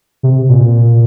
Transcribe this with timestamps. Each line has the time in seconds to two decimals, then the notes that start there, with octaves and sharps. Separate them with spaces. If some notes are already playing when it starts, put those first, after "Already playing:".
0.23 C3
0.49 A#2